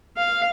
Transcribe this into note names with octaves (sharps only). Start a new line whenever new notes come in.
F5